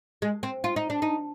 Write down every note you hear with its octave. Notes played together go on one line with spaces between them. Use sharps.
G#3
C4
F4
D#4
D4
D#4